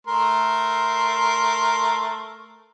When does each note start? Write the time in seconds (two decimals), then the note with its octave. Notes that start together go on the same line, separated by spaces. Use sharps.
0.07 A3 A#4 C6